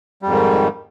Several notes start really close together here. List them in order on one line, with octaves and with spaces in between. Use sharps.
G3 F2 G#2 D#3